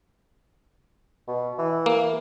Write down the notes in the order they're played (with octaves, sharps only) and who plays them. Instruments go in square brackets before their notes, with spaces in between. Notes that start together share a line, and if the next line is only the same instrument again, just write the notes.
[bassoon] B2
E3
[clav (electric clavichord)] A#3